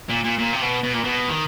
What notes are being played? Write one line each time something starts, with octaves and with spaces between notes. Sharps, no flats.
A#2
A#2
A#2
C3
B2
B2
A#2
B2
D#3